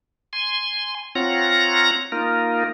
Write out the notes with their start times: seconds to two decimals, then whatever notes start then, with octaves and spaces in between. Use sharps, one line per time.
0.33 G#5 C6
1.15 C4 F4 C#5 F#5 A#5 A#6
2.12 A#3 D#4 F4 A#4